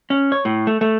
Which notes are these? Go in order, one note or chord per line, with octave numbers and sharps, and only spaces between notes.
C#4
C#5
A2
A3
A3